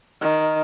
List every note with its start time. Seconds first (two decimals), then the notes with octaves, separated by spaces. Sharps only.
0.21 D#3